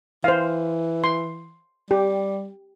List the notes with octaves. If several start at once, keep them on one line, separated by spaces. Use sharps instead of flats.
E3 C5 F5
C6
G3 G4